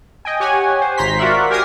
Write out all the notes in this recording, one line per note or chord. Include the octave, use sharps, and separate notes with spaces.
D#5 G5 G#5
G4 C#5 F#5 G#5
C5
G#1 A#5 C6 B6
F4 F#4 A#4 D5 E5 F#5
G4 A#4 G#5 G#6 A#6 C7